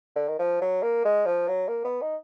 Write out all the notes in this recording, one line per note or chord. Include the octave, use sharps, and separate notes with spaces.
D3
D#3
F3
F#3
A#3
G#3
F3
F#3
A#3
B3
D#4